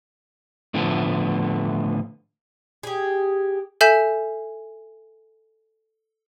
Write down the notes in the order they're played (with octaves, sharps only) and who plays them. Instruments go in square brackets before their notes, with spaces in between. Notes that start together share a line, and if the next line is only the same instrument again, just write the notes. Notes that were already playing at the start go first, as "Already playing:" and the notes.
[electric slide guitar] A2 D3 F3 A3 B3
[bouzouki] G4 G#4
[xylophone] A4 E5 G#5 G6 B6 E7